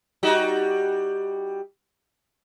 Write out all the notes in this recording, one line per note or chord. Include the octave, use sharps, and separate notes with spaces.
G3 D#4 F#4